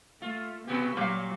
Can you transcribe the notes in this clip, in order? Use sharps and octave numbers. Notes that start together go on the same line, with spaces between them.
A3 F4
B2 B3 F#4 G4
A#2 F#3 G4 F5